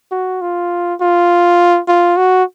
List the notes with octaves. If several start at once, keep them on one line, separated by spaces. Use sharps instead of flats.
F#4
F4
F4
F4
F#4